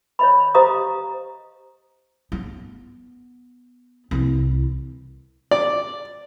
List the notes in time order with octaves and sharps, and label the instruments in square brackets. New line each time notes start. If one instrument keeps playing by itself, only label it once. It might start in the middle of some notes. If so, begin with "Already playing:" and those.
[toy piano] C#5 D#5 B5
G4 C5 D#5 F5 A#5 D#6
[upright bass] B3
C2 E3
[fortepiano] D5